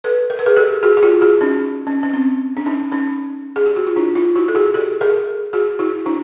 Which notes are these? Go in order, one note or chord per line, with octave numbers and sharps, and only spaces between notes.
A4 B4
A#4
B4
G#4 A#4
G4 A4
F#4 G#4
G#4
F4 G4
F#4 G#4
C#4 D#4
C#4
C#4
C4
D4
C#4 D#4
C#4 D#4
G#4
G4
F#4
F4
D4 E4
D#4 F4
E4 F#4
A4
F#4 G#4
G4 A4
G#4 A#4
F#4 G#4
E4 F#4
D4 E4